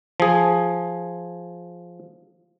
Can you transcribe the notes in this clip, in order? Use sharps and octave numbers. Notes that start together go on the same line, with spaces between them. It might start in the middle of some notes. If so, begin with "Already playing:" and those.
F3 G#4